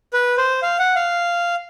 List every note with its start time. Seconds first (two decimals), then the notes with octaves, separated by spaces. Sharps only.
0.13 B4
0.38 C5
0.62 F5
0.79 F#5
0.96 F5